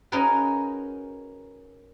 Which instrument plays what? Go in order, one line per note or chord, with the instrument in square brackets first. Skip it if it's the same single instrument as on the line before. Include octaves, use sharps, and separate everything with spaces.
[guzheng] C#4 D#4 F#4 G#4 A#4 B4